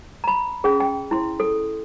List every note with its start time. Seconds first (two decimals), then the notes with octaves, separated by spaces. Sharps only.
0.24 A#5 B5
0.64 C#4 G#4
0.80 G5
1.11 E4 C6
1.40 A4